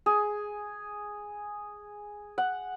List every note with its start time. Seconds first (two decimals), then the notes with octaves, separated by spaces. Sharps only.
0.06 G#4
2.38 F#5